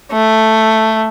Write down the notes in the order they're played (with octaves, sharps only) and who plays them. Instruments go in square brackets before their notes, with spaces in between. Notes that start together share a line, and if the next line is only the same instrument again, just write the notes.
[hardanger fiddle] A3